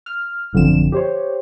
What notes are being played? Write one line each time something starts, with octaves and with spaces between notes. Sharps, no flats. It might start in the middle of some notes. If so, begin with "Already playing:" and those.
F6
A1 F#2 D3 F3 C4 E7
G4 C5 C#5